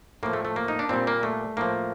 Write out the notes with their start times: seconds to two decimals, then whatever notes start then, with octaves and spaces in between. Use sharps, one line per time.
0.23 A2 F3 A#3
0.33 A3
0.45 A3
0.56 A#3
0.68 D#4
0.79 D4
0.89 A#2 G3 C4
1.07 A#3
1.23 A3
1.57 A2 F3 A#3